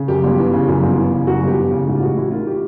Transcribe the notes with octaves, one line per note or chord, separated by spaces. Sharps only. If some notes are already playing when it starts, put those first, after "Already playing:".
Already playing: C#3
F#2 G4
G1
E3
C#3
F#2
G1
E3
C#3
F#2 F#4
G1
G4
E3
C#3
G#2 G4
F4
A1 F#4
A1 E4
D#3 F4
G4